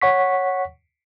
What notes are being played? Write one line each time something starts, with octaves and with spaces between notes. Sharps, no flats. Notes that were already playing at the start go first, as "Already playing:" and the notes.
C#5 F#5 C#6 B6